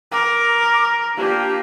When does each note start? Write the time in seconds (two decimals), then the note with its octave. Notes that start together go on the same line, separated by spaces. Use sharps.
0.12 A#4 D6
1.17 A#3 D4 F4 G4